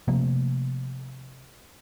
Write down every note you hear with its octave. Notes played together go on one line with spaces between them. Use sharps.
C3 F3 A3 A#3